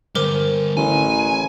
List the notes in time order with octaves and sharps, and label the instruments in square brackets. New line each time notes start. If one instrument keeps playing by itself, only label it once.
[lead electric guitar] D3 G3 [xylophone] A#4 C5 D6
[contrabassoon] A1 [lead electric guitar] G#5